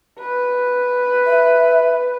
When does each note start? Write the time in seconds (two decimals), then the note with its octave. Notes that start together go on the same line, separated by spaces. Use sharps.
0.20 B4
1.26 E5